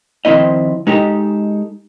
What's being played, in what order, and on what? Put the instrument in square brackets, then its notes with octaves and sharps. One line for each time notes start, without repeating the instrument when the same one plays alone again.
[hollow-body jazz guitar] D#3 F3 C4 E4 D#5
G#3 D#4 G4 A4